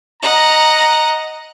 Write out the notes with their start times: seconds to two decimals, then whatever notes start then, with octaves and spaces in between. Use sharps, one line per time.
0.22 D#5 F#5 A#5